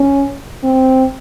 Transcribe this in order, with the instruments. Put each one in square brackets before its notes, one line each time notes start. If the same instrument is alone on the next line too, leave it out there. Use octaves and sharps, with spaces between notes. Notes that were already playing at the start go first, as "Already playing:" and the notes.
Already playing: [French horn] C#4
C4